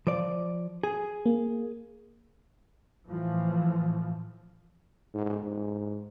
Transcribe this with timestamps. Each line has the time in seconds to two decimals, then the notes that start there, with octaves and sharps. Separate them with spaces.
0.07 F3 D5
0.83 G#4
1.26 A#3
3.08 A2 E3 F3
5.14 G#2
5.43 G#2